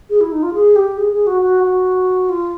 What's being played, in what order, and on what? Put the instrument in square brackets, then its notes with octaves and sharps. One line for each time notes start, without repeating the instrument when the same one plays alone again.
[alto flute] G#4
E4
D#4
F4
G#4
G4
G#4
G#4
F#4
F#4
F#4
F4